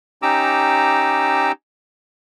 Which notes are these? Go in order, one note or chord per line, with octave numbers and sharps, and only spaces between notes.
C#4 D#4 G4 A#5 D6 E6